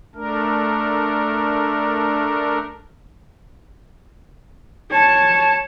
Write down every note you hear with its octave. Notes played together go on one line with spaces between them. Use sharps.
A3 D4 A#4
C#5 A5